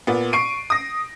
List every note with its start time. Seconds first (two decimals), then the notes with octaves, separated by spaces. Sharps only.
0.07 A#2 B3
0.33 C#6 C7 D7 D#7
0.70 D#6 A#6